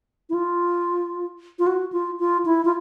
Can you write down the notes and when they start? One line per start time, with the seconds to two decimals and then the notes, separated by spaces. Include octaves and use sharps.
0.30 E4
0.34 F4
1.59 F4
1.67 F#4
1.93 F4
2.19 F4
2.45 E4
2.65 F4